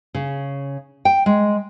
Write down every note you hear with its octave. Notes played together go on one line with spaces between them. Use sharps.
C#3
G5
G#3